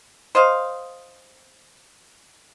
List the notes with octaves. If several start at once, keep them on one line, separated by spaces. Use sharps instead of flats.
C5 D#5 F5